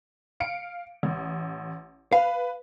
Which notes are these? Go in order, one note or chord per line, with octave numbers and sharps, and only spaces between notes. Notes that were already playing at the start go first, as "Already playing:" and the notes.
F5 C#7 D7
A1
B4 F5